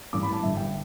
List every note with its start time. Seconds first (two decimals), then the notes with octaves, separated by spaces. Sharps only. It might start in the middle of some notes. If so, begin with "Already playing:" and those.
0.13 A1 G2 E3 D6
0.23 B5
0.32 A5
0.43 G1 G2 D3 E5
0.57 G5